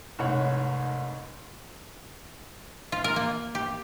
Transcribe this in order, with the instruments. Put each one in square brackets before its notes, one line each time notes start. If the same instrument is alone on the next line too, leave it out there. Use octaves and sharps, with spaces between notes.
[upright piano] F1 C2 G#2 C#5 F#5
[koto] F4
A#4
A#3
G4